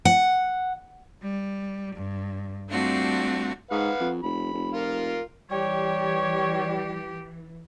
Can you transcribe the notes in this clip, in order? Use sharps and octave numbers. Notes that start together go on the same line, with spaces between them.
F#5
G3
G2
G3 A3 C4 D4 F4 F#4
G#2 B4 F5 F#5
F2
F1 B5
F1
F4 A#4
E3 G3 G4 C#5